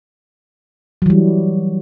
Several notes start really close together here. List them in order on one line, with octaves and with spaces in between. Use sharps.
F#3 E3 G3